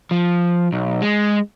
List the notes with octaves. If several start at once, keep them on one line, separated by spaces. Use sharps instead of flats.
F3
B1
G#3